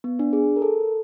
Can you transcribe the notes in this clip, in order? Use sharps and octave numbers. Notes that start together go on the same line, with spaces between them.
B3
D4
G#4
A#4
A4